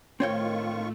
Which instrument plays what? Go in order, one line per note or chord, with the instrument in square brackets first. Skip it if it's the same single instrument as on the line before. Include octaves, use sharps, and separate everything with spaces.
[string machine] A2 A3 [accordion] D#3 F4 C#6 [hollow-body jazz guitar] C4 C#5 G5